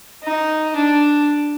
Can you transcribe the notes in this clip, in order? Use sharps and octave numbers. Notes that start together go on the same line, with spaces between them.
D#4
D4